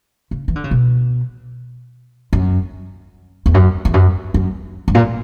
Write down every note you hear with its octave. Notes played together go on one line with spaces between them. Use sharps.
C#3
E3
D3
C#3
B2
F#2
E2
F#2
E2
F#2
F#2
G2
A#2